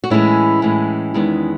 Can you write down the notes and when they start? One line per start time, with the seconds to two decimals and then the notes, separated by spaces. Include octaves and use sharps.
0.04 F#4
0.10 A2 E3 G#3 C#4 E4
0.62 A2 E3 G#3
1.14 E2 D#3 G#3 B3